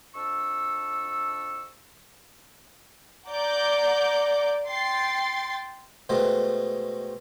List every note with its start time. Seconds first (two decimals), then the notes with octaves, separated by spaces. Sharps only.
0.15 F2 D4 C#6 E6
3.29 D5 F#5 A#5 D6 G6
4.67 G5 C6 A6 C7
6.09 B2 G#3 A3 C4